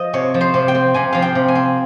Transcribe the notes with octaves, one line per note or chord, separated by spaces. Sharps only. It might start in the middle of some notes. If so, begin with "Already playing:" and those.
Already playing: F3 D#5
C3 C#5
F3
C5
C3
G5
C4
C3 G#5
F3 F5
G5
C3
G#5
C4